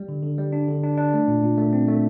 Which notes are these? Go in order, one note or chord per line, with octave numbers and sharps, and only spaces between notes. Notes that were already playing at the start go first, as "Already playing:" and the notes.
Already playing: G3
D3
D3
G3
D4
D3
D4
D4
A3
A#2
A#2
A3
C4
A3